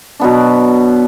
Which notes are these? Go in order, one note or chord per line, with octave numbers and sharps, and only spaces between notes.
B2 F#3 B3 D4